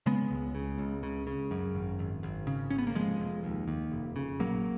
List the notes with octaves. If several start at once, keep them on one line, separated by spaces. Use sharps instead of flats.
C#3 G#3 B3
C#2
C#3
C#2
C#3
C#3
F#2
G#1
G#1
G#1
C#3
G#1 C#4
B3
A#3
F1 F3 G#3
F1
D#2
D#2
F1
C#3
A#1 F#3 A#3